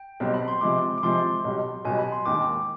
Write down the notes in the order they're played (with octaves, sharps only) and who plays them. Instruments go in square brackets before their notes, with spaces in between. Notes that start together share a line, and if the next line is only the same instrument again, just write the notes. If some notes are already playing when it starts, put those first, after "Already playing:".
Already playing: [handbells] G5
[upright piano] B1 B2 G3 C4 G4
[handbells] B5
C6
[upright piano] C3 F3 G#3 [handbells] D6
[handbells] D6
[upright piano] C3 F3 G#3 [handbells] C6
[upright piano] B1 B2 G3
[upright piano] B1 B2 G3 [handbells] G#5
[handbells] B5
C6
[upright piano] D#2 D#3 G#3 [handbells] D6